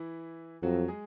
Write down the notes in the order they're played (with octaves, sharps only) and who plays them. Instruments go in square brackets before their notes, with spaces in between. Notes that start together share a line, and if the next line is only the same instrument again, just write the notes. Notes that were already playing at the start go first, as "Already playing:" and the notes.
Already playing: [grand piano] E3 E4
[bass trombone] F2 [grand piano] F#3 F#4
[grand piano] G#3 G#4